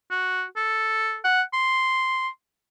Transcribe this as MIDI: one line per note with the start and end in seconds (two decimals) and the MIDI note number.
0.11 0.44 66
0.56 1.18 69
1.24 1.42 78
1.53 2.28 84